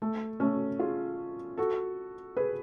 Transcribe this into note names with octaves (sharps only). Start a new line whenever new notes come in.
A3
A3 C#4
F4 G#4
F#4 A4
G#4 B4